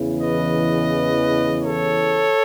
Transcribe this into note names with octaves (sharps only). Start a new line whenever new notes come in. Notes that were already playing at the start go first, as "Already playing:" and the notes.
Already playing: E2 C#3 E3
B4 D#5
A4 C#5